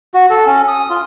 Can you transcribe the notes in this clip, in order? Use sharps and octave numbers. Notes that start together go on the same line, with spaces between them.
F#4
A4
C#4
D#6
F4